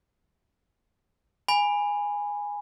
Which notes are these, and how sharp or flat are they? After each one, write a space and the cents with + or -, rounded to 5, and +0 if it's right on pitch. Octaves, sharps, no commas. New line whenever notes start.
G#5 -10 B5 +0